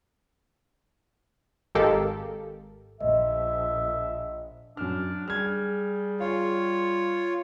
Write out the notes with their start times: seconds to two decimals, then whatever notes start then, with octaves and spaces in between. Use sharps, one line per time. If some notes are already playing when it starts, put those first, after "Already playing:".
1.75 G#1 G#3 G4 A4 A#4 F5
3.01 A#1 D#5 E5
4.77 F#2 D4 F6
5.28 G3 G#4 F6 G#6
6.20 F4 C#5 F5